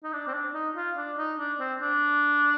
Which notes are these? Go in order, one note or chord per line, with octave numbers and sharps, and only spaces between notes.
D#4
D4
C4
D4
D#4
F4
D4
D#4
D4
C4
D4